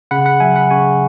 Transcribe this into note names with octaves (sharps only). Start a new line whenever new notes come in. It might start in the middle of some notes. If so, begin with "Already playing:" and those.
C#3 F#5 B5
F#5 B5
F#3 E5 G#5
F#5 B5
C#3 G#5 C#6